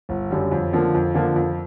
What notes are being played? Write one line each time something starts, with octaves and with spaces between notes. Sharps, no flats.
G1
F#2 D3 G3
F2
D3 F3 A#3
F2
D3 F3 A#3
F2